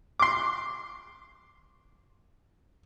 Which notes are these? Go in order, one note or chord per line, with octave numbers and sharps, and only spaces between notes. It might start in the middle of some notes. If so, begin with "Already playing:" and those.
C6 D6